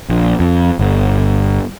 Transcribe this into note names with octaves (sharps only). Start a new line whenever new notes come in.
A#1
F2
G1